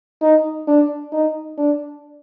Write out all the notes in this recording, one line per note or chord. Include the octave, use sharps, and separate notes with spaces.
D#4
D4
D#4
D4